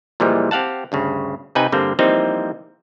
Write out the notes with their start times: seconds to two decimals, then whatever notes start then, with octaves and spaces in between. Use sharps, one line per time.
0.20 A#2 E3 F3 G3 G#3
0.51 C4 G4 F5 F#5 A5
0.92 D2 G2 C#3
1.55 C3 D#4 B4 G5 G#5
1.72 G2 D3 G3 A#3 C4
1.99 E3 F3 G3 A#3 C4 D#4